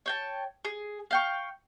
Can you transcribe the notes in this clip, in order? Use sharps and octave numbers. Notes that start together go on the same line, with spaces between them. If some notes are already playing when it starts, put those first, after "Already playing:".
C#5 G5 A5
G#4
F5 G5 C#6